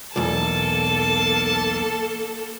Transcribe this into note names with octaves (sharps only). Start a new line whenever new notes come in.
B1 E2 A#3 A4 A5